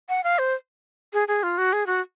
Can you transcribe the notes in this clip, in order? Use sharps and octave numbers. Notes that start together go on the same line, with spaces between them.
F#5
F5
C5
G#4
G#4
F4
F#4
G#4
F#4